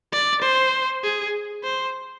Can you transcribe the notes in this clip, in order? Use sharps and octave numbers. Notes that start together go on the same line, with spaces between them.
D5
C5
G#4
C5